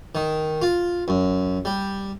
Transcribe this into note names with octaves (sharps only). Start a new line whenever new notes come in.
D#3
F4
F#2
G3